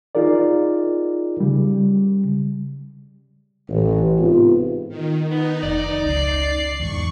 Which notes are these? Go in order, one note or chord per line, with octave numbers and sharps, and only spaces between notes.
D#4 F4 G#4 A#4 D5
C#3 G3
A1
G#2 C3 B3 F4
D#3
B3 D#4
F1 D5
C#2 C7
E2 G#2 C#6